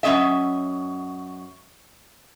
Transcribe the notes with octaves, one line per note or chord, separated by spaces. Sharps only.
F#2 G#3 C#4 D#5 E5